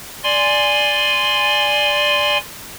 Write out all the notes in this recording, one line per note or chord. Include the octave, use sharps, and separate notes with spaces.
D5 G#5 C6